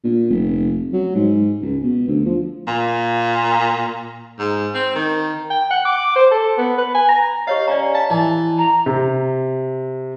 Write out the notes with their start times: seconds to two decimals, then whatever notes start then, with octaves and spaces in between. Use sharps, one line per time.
0.04 A#2
0.30 F1
0.93 F#3
1.15 G#2
1.62 C#2
1.83 B2
2.08 D2
2.25 F3
2.67 A#2
4.39 G#2
4.74 C4
4.95 D#3
5.50 G5
5.71 F#5
5.85 D6
6.16 C5
6.31 A4
6.58 B3
6.78 B4
6.95 G#5
7.09 A#5
7.47 G4 C#5 D#5 F5
7.68 C#4 D5 A#5
7.94 F5 A5
8.10 E3 A5
8.58 A#5
8.86 C3